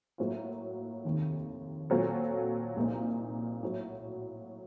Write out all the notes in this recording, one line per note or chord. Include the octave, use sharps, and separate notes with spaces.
A2 F#3 A#3 F4
F1 D#2 D#3
A#2 F#3 C4 F4 A4
C2 A#2 F3 A#3 D#4
A2 F#3